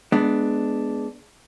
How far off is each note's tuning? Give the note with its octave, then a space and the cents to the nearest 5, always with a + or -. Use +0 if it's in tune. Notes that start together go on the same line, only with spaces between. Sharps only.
G#3 +15 B3 +0 D4 +0